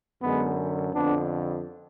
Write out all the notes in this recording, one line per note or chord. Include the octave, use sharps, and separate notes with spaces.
F#2 D3 G#3 B3
F2 D3 B3 D4